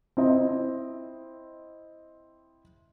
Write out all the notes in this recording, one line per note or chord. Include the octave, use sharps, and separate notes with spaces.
C4 E4 D#5